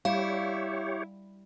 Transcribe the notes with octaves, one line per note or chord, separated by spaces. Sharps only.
G3 E4 G4 C#5 F5